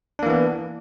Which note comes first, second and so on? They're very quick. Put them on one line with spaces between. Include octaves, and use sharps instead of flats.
D4 A#3 E3 B3